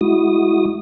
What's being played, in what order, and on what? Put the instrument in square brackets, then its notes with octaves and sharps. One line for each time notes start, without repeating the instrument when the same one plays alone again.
[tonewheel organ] G#3 E4 F#4 D#6